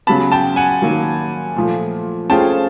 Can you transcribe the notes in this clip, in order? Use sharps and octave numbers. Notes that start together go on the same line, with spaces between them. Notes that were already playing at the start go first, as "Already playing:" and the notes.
C#3 F#3 B3 A5 B5
G5 A5
F#5 G#5
D#3 F#3 A#3
A#2 F3 A3
A3 C#4 F4 G#4 C5 G5 A5